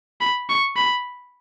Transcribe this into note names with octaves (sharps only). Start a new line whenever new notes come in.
B5
C#6
B5